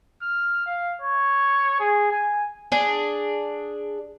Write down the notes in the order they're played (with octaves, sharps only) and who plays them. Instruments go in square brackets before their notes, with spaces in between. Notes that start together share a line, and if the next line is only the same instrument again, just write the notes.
[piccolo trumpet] F6
F5
C#5
G#4
G#5
[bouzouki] D4 G#4